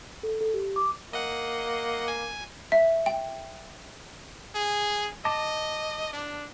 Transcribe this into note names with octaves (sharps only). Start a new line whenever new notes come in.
A4
A4
G4
D6
A#3 D#5 F#5
G#5
E5
G5
G#4
D#5 A5 D6 A#6
D4